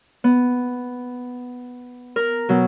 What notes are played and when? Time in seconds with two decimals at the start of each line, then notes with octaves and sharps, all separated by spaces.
0.24 B3
2.16 A#4
2.49 B2 F#3